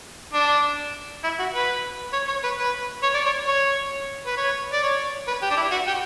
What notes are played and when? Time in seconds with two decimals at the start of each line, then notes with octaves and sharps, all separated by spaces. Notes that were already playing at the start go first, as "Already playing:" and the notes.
0.33 D4
1.24 E4
1.39 F#4
1.54 B4
2.13 C#5
2.28 C#5
2.43 B4
2.58 B4
3.03 C#5
3.14 D5
3.25 C#5
3.47 C#5
4.26 B4
4.37 C#5
4.73 D5
4.83 C#5
5.27 B4
5.42 G4
5.51 D4
5.57 E4
5.71 F#4
5.87 G4